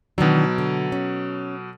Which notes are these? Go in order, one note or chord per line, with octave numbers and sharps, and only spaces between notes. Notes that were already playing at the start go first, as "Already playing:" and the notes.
B2 D#3 E3 F#3 D4
D3
C#4